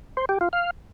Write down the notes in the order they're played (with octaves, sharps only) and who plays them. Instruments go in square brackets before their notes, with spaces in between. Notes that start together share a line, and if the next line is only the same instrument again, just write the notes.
[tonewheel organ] C5
G4
F4
F5